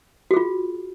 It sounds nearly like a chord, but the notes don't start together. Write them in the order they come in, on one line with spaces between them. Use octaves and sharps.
F#4 G#4 F4